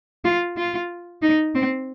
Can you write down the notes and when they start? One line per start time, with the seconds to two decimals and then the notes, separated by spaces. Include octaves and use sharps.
0.25 F4
0.57 F4
1.22 D#4
1.55 C4